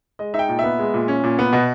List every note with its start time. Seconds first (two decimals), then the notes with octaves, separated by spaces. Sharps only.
0.19 G#3 D#5
0.34 D#4 E5
0.39 G5
0.49 A#2
0.59 B3 E5
0.79 G#3
0.94 A#2
1.08 C#4
1.24 A#2
1.39 B3
1.53 B2